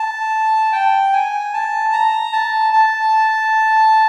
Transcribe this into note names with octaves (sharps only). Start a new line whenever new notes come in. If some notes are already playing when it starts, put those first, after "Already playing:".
Already playing: A5
G5
G#5
A5
A#5
A5
A5